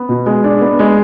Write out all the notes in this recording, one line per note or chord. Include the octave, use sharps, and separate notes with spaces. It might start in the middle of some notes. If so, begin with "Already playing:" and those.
Already playing: B3
B2
G#3
D4
B3
G#3